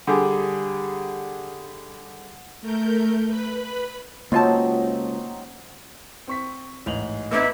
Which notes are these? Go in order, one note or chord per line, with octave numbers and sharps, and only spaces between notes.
D3 G3 G4 G#4
A3 A#4 G6
B4 B5
C#2 F#3 A#3 C4 D#4 F4 A5
C4 C#6 B6
A1 G#2 F7 F#7
B3 C4 D#4 B4 E5 D6 E6